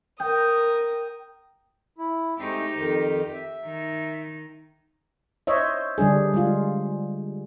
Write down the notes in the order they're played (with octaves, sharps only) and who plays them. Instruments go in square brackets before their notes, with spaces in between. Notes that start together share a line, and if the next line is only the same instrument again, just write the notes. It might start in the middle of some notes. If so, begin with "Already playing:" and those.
[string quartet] A#4 D#6 [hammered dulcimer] G5
[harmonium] E4
[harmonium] G#3 A3 C4 [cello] D#4 G4
[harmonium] F2 D#3
E5
[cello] D#3 D#4
[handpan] C5 C#5 D#5 E5
D3 G3 D4 G#4
G#3 F4